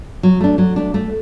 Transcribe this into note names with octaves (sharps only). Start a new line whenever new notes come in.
F#3
A3 D4
F#3
A3 D4
A3